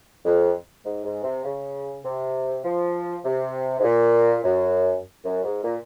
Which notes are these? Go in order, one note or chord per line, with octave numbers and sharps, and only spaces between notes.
F2
G#2
G#2
C3
C#3
C3
F3
C3
G#2
A#2
F#2
F#2
G#2
A#2